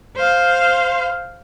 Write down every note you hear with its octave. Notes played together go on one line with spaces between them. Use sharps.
C5 F5